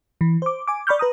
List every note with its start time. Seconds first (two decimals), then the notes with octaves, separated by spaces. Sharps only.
0.21 E3
0.42 C5 D6
0.67 G#5 D6
0.87 D5 B5 C#6 F6 G6
0.99 B4 A#5 D#6